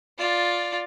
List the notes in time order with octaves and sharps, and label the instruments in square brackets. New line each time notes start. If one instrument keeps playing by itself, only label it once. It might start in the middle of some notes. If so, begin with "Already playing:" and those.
[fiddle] F4 D5